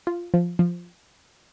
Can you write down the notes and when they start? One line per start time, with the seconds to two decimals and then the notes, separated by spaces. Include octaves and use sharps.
0.07 F4
0.34 F3
0.59 F3